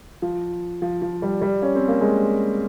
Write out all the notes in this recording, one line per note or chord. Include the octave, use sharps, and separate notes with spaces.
F3
F3
F3
G3
G3
C#4
C4
A#3
G#3